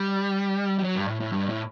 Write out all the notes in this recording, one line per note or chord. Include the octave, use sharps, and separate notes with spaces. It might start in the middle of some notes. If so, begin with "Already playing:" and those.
Already playing: G3
G3
F#3
G2
A2
A2
G2
A2